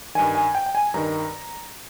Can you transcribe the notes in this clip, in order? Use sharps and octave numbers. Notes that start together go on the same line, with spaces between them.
G2 D#3 G#5
G#5
G5
G5
G#5
G2 D#3 A#5